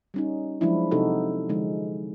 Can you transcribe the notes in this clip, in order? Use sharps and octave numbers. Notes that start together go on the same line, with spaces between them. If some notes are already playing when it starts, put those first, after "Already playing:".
G3 C#4 D#4
F3 F#3 G#3 D4 E4
C3 D#4 F#4 A4
D3 F3 G#3 D#4